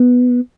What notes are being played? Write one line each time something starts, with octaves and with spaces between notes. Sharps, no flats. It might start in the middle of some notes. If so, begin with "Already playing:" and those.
Already playing: B3